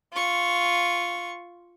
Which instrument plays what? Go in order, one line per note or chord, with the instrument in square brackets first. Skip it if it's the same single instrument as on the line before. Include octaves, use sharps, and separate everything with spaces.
[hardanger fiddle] F4 C#6